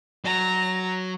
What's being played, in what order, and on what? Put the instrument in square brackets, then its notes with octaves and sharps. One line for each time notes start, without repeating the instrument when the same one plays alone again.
[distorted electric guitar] F#3 [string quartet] A#5